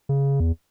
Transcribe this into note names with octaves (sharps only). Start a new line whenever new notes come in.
C#3
E2